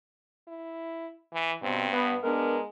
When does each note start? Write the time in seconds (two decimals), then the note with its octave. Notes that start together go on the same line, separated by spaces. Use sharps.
0.48 E4
1.34 E3
1.62 G2 B2 C4
1.92 B3
2.23 G#3 B3 D4 A#4